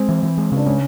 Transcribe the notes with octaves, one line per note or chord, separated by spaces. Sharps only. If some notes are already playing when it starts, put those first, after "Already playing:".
Already playing: G#3 C4
E3
E3
G#3
C#3
D4
G#3 C#4